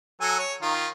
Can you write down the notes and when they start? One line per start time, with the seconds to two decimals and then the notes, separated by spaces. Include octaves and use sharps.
0.21 F#3 A4 G#5
0.39 C#5
0.62 D#3 F4